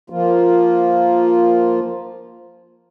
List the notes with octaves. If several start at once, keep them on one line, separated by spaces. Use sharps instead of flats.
F3 A#3 F4